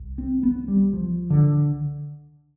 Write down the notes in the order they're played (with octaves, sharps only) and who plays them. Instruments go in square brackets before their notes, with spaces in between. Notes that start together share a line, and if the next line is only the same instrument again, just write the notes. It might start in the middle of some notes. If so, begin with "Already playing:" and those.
Already playing: [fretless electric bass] C2
C4
B3
G3
F3
D3